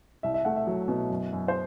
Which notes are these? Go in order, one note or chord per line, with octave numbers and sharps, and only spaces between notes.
C2 E5
E5
A3 F#5
E5
F#3
B2
F#2
F#2
C5